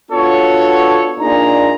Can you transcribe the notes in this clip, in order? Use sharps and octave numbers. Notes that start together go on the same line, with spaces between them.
B3 D4 F4 F#4 A4 C#5
A#2 D4 D#4 G#4 A#5